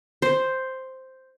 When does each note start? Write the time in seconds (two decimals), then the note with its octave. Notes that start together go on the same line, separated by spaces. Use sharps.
0.22 C5